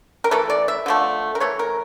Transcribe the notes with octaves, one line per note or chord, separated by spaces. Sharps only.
A#4
E3 A3 A4
D5
E5
D3 F3 A3
A#4
E3 A3 C#5
A#4